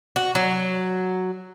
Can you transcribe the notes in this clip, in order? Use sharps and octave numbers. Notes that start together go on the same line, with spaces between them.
F#4
F#3